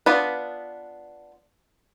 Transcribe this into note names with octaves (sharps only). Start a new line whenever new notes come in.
B3 D4 F4 B4